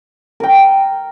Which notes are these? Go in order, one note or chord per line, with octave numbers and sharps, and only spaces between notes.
A#4 G5